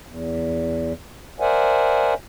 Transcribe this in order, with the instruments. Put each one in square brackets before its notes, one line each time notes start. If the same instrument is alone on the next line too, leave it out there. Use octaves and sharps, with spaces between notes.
[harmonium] E2
A#4 C5 D5 E5 F#5 G#5